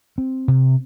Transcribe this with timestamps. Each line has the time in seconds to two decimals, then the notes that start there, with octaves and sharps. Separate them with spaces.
0.18 C4
0.48 C3